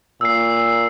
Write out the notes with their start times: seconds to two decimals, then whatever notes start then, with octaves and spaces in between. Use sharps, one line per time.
0.21 A#2 E6 C7